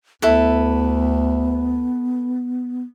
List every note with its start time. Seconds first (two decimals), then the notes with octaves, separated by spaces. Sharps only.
0.22 D2 B3 E4 A4 B4